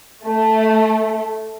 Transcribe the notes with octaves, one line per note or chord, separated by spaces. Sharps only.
A3